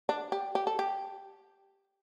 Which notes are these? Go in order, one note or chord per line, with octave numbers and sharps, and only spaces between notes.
D4
G4
G4
A4
G4